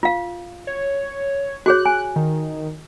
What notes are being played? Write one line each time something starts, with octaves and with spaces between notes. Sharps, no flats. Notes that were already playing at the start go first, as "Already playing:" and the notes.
F4 F5
C#5
F#4 G#4 C#5 F#6
G#5
D#3